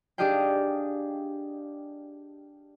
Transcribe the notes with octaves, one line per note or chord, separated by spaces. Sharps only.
D4 G4 G#4 D#5 F5 G5